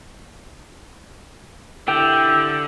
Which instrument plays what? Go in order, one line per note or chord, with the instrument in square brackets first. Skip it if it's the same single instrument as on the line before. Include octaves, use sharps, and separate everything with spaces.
[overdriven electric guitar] D3 [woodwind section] E4 G4 [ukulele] G5 [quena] E6